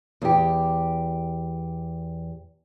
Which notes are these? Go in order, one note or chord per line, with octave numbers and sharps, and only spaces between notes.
E2 G4